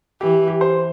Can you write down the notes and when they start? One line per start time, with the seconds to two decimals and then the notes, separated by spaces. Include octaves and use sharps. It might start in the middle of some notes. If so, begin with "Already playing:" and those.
0.21 E3 G4
0.48 G4
0.61 C5